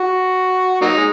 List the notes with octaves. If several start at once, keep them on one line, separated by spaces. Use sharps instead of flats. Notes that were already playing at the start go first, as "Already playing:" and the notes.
Already playing: F#4
F#3 A#3 D#4
G#3